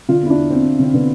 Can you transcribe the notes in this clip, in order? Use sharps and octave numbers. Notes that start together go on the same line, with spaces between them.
D3 F4
E2 E4
D4
E2
E2 C4
E2
D3 C4
D3 B3